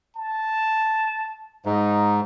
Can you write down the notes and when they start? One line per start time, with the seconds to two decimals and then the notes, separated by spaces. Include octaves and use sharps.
0.16 A5
1.66 G#2 D#4